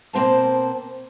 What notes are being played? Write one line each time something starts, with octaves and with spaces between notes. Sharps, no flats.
B2 A#3 C4 C5 A5